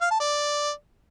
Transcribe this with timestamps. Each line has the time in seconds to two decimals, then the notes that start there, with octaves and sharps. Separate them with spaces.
0.01 F5
0.11 A5
0.20 D5